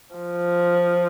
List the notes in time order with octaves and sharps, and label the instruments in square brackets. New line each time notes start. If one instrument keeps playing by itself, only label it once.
[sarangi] F3